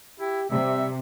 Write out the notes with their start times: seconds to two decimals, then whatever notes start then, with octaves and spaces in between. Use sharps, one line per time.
0.20 E4 G4
0.51 C3 G3 E5